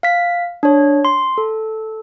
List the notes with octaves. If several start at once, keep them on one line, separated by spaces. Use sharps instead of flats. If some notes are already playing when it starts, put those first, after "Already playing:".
F5 B6
D4 C#5
C6
A4